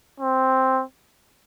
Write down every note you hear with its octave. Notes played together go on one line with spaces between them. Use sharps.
C4